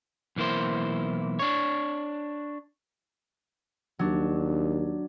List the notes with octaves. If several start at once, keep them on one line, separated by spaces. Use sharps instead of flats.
B1 E3 A#3 E4 C5
D4 C#5
D#2 F#3 D4